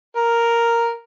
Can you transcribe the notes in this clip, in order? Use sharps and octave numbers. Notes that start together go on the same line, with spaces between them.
A#4